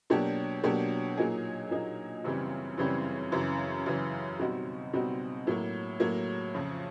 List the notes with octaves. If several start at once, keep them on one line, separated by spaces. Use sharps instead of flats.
B2 F#3 A#3 D4 G4
B2 F#3 A#3 D4 G4
A#2 F#3 A#3 D#4 G#4
A#2 F#3 A#3 D#4 G#4
F#2 C#3 E3 G3 C4
F#2 C#3 E3 G3 C4
F#2 C#3 E3
F#2 C#3 E3
B2 G3 C4 D#4 F#4
B2 G3 C4 D#4 F#4
A2 F#3 A#3
A2 F#3 A#3
F2 C#3 F3